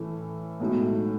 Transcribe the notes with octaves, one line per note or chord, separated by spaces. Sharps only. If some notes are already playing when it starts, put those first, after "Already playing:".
Already playing: A2 E3 A3 C#4
B1 A2 G#3 D#4 F#4